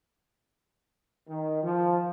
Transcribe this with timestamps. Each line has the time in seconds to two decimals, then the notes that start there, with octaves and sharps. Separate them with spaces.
1.28 D#3
1.63 F3